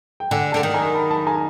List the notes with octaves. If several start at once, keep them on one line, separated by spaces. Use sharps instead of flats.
G5
D3 F#5 G#5
D3 G5 A5
D#3
G#5 A#5
A5 B5
A5 B5
G#5 A#5